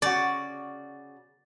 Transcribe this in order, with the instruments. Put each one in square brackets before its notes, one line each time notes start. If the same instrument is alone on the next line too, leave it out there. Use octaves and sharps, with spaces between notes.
[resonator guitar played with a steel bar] C#3 F#4 [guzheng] D5